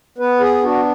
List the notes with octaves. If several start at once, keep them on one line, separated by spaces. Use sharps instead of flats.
B3 B4
G#4
D4 F#4